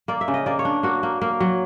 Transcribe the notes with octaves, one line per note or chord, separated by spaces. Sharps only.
A#3 D5
E5
C#3
D#5
A#3 D5
C#5
D4
A#3 F#4
A#3
A#3
F#3